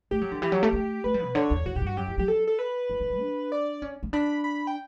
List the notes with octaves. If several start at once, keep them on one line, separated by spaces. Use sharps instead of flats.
A3 G4
F#3
D3
E3 G4
F#3
A3
A3
A3 B4
G3
B2
D3 C#5
E2
E2 F#4
A2 G4
G2
F#4
F#2 G4
E3
F#3 G4
A4
A4
B4
E3
D3
F#3
D4
D5
C#4
C#4
D4 B5
B5
G5